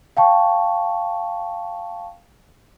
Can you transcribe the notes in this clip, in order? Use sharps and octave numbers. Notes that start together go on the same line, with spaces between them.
F5 G5 A5 C#6